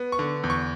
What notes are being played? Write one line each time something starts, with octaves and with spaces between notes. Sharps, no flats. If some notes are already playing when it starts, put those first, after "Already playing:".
Already playing: B3
C#6
D3
E2
C#6